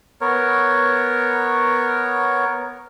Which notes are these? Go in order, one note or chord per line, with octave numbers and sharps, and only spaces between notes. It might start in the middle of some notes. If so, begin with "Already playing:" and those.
B3 A#4 C#5